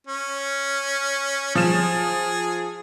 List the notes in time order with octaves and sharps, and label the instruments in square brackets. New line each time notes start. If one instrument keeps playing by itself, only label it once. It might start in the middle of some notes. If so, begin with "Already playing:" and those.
[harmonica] C#4
[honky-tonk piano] F3 E7 [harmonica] G#4